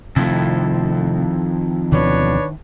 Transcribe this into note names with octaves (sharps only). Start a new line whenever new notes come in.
F2 C3 D#3 A3 E4 A4
D2 B2 E3 D4 B4 C#5